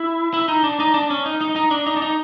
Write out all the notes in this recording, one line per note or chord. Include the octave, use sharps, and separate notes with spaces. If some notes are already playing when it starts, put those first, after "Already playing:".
Already playing: E4
E4
D#4
D4
D#4
D4
C#4
D#4
D#4
D#4
D4
D#4
D4
D#4